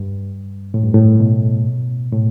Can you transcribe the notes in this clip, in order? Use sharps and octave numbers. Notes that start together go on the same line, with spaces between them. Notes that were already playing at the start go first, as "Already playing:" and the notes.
Already playing: G2
A2
G2
A2
B2
A2